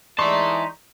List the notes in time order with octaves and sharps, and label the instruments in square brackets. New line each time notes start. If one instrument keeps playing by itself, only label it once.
[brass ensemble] E3 G#3 D5 [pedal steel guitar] D#4 C6 C#6 [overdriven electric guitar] E5 A5